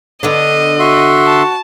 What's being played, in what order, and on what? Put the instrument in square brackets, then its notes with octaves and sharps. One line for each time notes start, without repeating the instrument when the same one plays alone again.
[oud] D3 B3 D4 [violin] D#5
[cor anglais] F#4 [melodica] E5 C6
[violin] A5